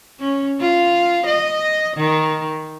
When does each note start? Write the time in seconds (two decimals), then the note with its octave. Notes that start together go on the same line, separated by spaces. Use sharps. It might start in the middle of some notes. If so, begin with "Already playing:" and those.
0.20 C#4
0.60 F4
1.26 D#5
1.97 D#3